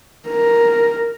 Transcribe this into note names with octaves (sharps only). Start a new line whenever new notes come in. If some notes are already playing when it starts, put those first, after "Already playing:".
A#4